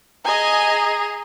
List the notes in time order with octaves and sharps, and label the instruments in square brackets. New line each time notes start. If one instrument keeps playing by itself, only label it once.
[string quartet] G#4 [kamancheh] D#5 G#5 [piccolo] A#5